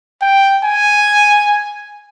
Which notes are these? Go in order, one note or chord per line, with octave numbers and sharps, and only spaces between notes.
G5
G#5